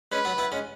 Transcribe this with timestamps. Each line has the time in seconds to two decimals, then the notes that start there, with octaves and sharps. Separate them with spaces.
0.12 G#3 C#4 B4
0.25 F#3 B3
0.38 B3 E4
0.52 G#3 C#4